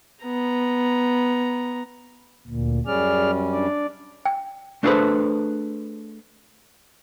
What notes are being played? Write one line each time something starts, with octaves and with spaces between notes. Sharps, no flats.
B3 A#5
D2 A#2
F#2 G3 C#4 G#4 D5 F6
D4 D5
G5
A3 D4 G#4 A4 B4 C5